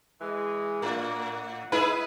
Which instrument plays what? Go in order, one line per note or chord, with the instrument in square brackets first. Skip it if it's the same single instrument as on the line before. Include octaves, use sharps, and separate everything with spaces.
[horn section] E3 G#3
[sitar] A2 [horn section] A#3 D4 F#4
[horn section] F#5
[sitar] D#4 E4 G#4 [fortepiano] B4